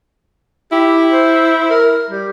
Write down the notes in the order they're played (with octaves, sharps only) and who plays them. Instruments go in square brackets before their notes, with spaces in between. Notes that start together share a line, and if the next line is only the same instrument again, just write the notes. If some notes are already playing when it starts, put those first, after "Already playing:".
[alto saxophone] E4 [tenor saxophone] G4
[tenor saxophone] C5
A#4
G3